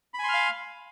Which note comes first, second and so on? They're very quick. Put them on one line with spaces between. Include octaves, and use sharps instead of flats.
B5 G#5 C6 F6 F5